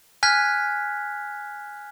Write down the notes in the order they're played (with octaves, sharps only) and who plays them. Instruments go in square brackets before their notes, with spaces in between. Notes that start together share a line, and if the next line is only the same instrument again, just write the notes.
[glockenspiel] G#5 F6 F#6 G#6 B6